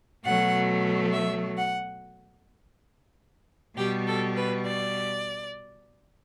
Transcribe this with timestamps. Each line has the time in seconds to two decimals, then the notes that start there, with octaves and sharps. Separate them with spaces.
0.25 B2 F#3 A3 F#5
1.12 E5
1.57 F#5
3.76 B2 G3 G4
4.06 A4
4.36 B4
4.65 D5